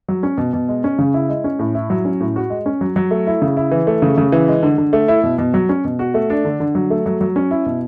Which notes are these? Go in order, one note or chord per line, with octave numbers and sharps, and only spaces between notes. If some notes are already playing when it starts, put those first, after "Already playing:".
F#3
C#4
B2
B2
G#3
C#4
C#3
E4
G#3
C#4
A2
E4
F#3
C#4
A2
F#4
G#3
C#4
F#3
F#3
A3
E4
C#3
E4
E3
A3
C#3
C#3
E3
G#3
D3
D3
A3
E4
B2
B2
F#3
C#4
B2
F#4
A3
D4
D3
D3
F#3
A3
F#3
F#3
C#4
E4
B2